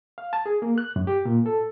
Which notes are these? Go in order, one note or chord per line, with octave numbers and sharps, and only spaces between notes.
F5
A5
G#4
A#3
F#6
F#2
G4
A#2
A4